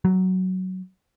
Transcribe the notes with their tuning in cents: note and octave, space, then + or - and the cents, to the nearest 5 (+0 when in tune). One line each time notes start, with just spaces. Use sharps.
F#3 +10